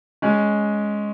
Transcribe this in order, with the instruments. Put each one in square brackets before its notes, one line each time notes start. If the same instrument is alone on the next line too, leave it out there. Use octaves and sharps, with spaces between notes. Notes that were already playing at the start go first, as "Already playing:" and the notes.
[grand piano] G#3 C#4